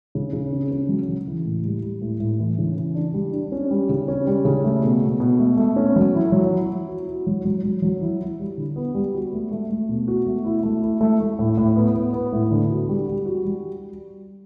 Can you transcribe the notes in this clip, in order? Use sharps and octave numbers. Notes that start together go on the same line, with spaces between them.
C#3
C#3
C#4
C#4
F#3
C#3
E3
A2
G3
G3
A2
A2
E3
C#3
E3
D4
G3
D4
C#4
G3
C#3
C#4
G3
C#3
A3
B2
B2
B2
A3
A3
C#4
F#3
E4
F#3
E4
E4
F#4
F#4
F#3
F#3
F#3
F#3
E4
E4
G3
D3
B3
G3
F#4
A3
A3
A3
B2
F#4
A3
E4
A3
E4
A3
A3
A2
A2
B3
B3
B3
A2
D3
F#4
G3
G3
F#4
G3